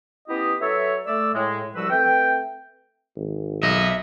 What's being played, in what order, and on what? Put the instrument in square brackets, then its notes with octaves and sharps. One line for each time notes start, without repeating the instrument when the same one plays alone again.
[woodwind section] B3 C#4 E4 G4 D#5
F#3 A4 B4 C#5 E5
A3 D5 E6
A2 G#3
C2 F3 G3 F#4 B4 E6
A3 C4 B4 G5
[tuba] G#1
[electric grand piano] B1 [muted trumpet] D#5 [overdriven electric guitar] E5